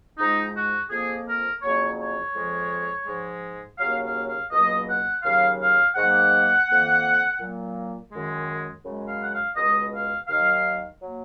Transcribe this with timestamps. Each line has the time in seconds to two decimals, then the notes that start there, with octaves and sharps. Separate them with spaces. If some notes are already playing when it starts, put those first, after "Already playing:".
0.18 G#2 F3 G#3 D#4
0.54 F#4
0.90 F2 F3 A#3 G#4
1.27 A#4
1.62 F2 C#3 F#3 A#3 C#5
1.99 C#5
2.34 F2 F3 G#3
3.07 G#2 F3 G#3
3.79 D#2 C#3 F#3 A#3 F5
4.03 F5
4.27 F5
4.51 C#2 B2 F#3 A#3 D#5
4.87 F#5
5.23 D#2 C#3 F#3 F5
5.59 F5
5.96 G#2 D#3 F#3 A#3 F#5
6.68 F2 D#3 A#3
7.40 A#2 F#3 A#3
8.12 F#2 D#3 G#3
8.84 F#2 C#3 G#3
9.09 F5
9.20 F#5
9.32 F5
9.56 C#2 B2 G#3 D#5
9.92 F5
10.28 D#2 D#3 F#3 F5
11.01 F#3 A#3